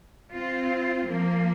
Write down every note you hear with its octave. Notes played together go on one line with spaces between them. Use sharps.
C4 F4
F3 A#3